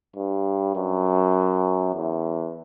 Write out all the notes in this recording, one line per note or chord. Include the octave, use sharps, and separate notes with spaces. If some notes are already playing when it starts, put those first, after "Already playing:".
G2
F#2
E2